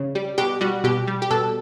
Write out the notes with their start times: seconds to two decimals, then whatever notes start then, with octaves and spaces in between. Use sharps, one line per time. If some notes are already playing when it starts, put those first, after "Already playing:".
Already playing: C#3
0.15 G3
0.38 B2 G4
0.61 G3 F#4
0.84 B2 G4
1.07 G3
1.22 G4
1.30 B2 A4